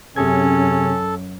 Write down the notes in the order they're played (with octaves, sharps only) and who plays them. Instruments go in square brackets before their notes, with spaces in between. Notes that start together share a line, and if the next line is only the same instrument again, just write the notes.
[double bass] F#2 [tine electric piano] C3 G#4 G#6 [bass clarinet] C#4 [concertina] A4